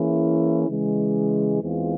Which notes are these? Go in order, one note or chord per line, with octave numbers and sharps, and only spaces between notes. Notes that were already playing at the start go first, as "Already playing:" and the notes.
Already playing: E3 A#3 C#4 E4 G#4
C#3 E3 G#3
E2 E3 G#3 C4 F4